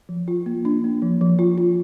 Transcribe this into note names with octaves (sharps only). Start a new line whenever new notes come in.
F3
F4
A#3
D4
A#3
F3
F3
F4
F4